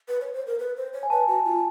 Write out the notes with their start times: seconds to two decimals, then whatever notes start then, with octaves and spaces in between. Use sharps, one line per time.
0.08 B4
0.21 C#5
0.34 C5
0.46 A#4
0.59 B4
0.76 C5
0.93 C#5
1.03 G#5
1.10 B4 A5
1.27 F#4
1.45 F4